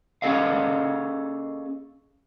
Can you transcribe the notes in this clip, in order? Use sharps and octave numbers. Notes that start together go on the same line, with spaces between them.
A#3 C#4 G#4 A4 D#5 F5